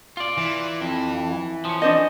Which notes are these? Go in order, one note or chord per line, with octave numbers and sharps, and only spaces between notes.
F4 D5
E3
F2
F3 C#4
D4 C5 D#5